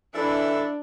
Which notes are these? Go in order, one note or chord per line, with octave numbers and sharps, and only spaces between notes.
E3 D4 E4 A4 E5